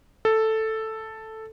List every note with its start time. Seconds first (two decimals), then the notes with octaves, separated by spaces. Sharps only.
0.25 A4